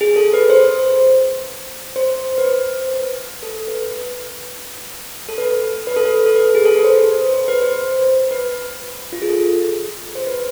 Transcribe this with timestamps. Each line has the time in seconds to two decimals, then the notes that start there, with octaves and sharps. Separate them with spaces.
0.01 G#4
0.16 A4
0.33 B4
0.50 C5
1.96 C5
2.38 B4
2.45 C5
2.93 B4
3.43 A4
3.68 B4
3.91 B4
5.29 A4
5.38 B4
5.87 B4
5.96 A4
6.05 B4
6.26 A4
6.36 B4
6.55 G#4
6.65 A4
6.75 B4
6.85 C5
7.34 C5
7.48 B4
7.62 C5
8.31 B4
9.13 F4
9.22 G#4
9.29 A4
10.15 C5
10.27 B4